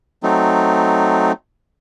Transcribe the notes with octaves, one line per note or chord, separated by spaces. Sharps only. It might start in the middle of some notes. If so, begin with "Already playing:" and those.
F#3 A3 C4 D#4